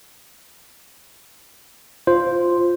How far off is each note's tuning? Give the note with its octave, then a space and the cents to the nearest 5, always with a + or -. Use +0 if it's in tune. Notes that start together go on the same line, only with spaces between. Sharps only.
F4 +0 C5 +0